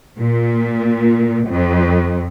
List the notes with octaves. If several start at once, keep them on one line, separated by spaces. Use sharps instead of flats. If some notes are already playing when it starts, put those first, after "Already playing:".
A#2
F2